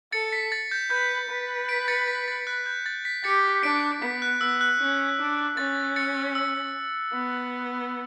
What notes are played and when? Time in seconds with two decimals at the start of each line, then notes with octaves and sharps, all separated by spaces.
0.12 A4 A6 C#7
0.33 B6
0.52 A6
0.71 G6
0.90 B4 G6
1.30 B4
1.69 B6 D7
1.88 A6 C#7
2.08 B6
2.28 A6
2.47 F#6
2.66 G6
2.86 A6
3.05 B6
3.24 G4 A6 C#7
3.63 D4 B6 D7
4.02 B3 B6
4.22 F#6
4.41 B3 E6
4.61 F#6
4.80 C#4
5.19 D4
5.57 C#4 A6
5.96 A6 C#7
6.35 E6
7.13 B3